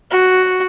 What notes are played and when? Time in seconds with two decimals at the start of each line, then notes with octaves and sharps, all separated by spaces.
0.10 F#4